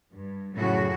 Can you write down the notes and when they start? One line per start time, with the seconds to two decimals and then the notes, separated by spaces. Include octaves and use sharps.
0.12 G2
0.55 F#2 A2 C#3 F#4